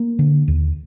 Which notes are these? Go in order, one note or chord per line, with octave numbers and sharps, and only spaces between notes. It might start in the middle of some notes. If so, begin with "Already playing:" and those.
Already playing: A#3
D3
D#2